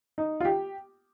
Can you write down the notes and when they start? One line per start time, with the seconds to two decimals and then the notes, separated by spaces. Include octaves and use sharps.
0.18 D#4
0.40 F4
0.45 G4